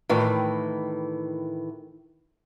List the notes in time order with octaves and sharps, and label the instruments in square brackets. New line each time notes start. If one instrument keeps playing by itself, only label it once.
[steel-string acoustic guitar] A2 D#3 E3